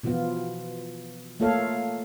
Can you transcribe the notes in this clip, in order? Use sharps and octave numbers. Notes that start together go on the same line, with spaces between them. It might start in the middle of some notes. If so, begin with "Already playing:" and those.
B2 E3 F3 B3 F4
A3 A#3 F4 A4 C#5 F5